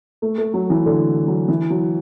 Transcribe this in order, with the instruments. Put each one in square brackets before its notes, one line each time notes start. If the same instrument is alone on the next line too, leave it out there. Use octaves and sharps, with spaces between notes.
[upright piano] A3
A3
F#3
E3
D3
F#3
E3
F#3